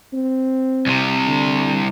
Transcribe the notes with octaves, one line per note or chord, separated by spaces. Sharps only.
C4
C2 C3
D3